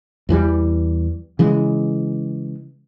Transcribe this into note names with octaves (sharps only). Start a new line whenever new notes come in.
E2 E3 F3 G3
C#3 E3 G#3